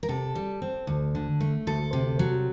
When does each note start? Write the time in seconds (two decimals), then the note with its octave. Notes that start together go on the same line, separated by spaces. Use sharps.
0.03 A#4
0.09 C3 A4
0.35 G3
0.62 C4
0.87 D2
1.15 D3
1.40 A3
1.67 D2 A4
1.93 C3
2.19 F#3